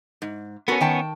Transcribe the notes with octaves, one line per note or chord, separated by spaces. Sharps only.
G#2
B3 C#4 F#4 A4 A#4
D#3 G5 A5